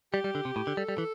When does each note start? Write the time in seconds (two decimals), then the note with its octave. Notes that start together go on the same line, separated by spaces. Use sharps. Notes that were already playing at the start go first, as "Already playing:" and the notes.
0.13 G3 G4
0.24 G3
0.35 D3
0.45 C3
0.56 A2
0.67 D3
0.77 G3 A4
0.89 G3
0.98 E3